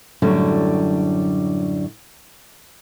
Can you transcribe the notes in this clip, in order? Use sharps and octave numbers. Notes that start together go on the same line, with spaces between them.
F#2 A2 D3 F#3 G3